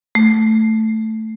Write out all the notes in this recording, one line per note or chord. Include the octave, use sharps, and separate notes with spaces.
A3